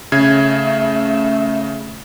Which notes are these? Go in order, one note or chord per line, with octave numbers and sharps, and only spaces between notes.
C#3 A3 E5 G#6